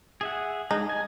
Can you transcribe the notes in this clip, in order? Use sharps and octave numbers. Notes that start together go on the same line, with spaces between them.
G#4 E5 F#5
G#3 D#4
G#5